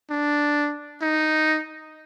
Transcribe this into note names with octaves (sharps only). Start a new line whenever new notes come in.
D4
D#4